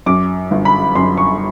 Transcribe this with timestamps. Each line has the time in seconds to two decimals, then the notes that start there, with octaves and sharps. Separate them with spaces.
0.06 F#2 D6
0.51 G1
0.65 B5
0.95 F#2 C6
1.17 C#6